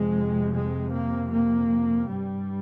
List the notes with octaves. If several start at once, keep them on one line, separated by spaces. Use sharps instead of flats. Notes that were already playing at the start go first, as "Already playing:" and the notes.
Already playing: F2 C3 G#3
G#3
A#3
A#3
G2 G3